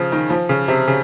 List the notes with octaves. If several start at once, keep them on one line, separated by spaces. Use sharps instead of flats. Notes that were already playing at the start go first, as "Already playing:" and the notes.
Already playing: C#3 F3
D#3
F3
C#3
C3
C#3